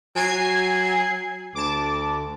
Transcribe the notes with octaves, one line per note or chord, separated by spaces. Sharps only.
F#3 G#5 G#6 C7
D2 A5 D6